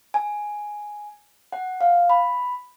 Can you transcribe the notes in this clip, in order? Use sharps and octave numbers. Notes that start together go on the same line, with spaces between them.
G#5
F#5
F5
B5